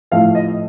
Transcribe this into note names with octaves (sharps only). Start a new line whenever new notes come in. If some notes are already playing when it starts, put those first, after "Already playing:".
A2 F3 A3 F5
D#5